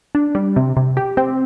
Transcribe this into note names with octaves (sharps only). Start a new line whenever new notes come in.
D4
G3
C3
C3
G4
C4